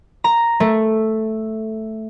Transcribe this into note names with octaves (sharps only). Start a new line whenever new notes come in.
A#5
A3